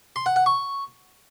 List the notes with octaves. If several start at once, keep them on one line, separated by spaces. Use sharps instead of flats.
C6
F#5
F#5
C#6